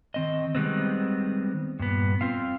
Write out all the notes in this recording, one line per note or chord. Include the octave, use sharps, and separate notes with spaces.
D#3 C4 D#5
D#3 G3 G#3 B3 C4
G2 A#2 B3
C4 F4 F5